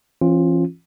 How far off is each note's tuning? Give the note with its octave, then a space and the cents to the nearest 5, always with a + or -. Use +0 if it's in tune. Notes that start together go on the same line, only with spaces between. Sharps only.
E3 +30 C#4 -40 F4 +0